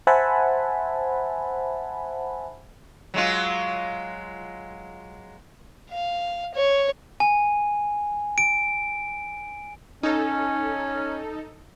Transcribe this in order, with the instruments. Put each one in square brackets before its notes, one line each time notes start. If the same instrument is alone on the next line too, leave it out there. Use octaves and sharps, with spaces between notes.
[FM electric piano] C5 E5 F#5 G#5 A5 B5
[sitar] F#3 G#3 F4
[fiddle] F5
C#5
[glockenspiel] G#5
D7
[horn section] C#4 [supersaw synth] D#4 A4